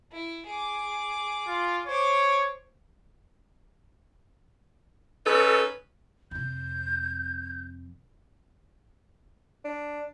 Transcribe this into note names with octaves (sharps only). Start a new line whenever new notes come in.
E4
G#4 D6
F4
C5 C#5 D6
C#4 D#4 A4 B4
F2 C3 G6
D4